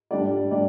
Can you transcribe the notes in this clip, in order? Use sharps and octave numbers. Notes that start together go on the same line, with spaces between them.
G3 D4 G4 D5
G3 D4 G4 D5